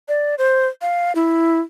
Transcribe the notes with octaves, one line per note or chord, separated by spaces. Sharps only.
D5
C5
F5
E4